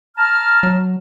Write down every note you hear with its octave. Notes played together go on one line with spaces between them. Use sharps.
A5 A#5 F6
F#3